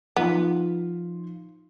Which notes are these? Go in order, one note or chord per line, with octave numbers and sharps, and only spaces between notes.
F3 B3 D#4 F4